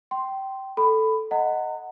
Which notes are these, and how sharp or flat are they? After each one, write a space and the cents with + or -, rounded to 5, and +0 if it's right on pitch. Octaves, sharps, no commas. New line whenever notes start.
G5 -20 C6 +0
A4 +0 B5 +10
D#5 +0 F#5 +0 A#5 -35